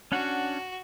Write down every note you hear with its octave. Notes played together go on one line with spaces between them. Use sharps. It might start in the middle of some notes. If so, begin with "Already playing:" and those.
C#4 D4 F#4 F#5